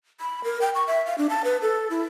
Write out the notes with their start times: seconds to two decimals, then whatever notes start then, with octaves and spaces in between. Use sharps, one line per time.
0.20 B5
0.44 A#4
0.61 G5
0.75 C#6
0.87 E5
1.06 F5
1.18 D4
1.30 A5
1.44 B4
1.62 A4
1.90 E4